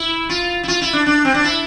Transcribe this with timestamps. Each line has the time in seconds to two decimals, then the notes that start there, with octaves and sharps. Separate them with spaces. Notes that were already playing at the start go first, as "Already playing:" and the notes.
Already playing: E4
0.29 F4
0.63 E4
0.68 F4
0.82 E4
0.93 D4
1.06 D4
1.25 C4
1.34 D4
1.44 E4